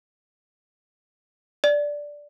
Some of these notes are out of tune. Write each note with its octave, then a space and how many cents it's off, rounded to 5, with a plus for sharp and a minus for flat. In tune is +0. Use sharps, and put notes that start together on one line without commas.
D5 -5